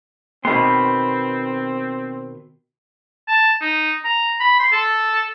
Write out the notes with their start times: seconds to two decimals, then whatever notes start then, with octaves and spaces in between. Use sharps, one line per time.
0.45 B2 D#3 B3 C4 B5 C6
3.28 A5
3.61 D#4
4.05 A#5
4.40 B5
4.60 C6
4.72 A4